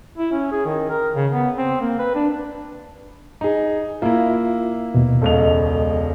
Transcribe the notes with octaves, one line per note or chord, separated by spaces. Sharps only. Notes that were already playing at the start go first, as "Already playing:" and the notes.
E4
C#4
G#4
D#3
A#4
C#3
B3
C4
A#3
B4
D4
D#4 G#4
A#3 E4 F4 E5
D#2 B2
E1 C#2 A4 D#5 F7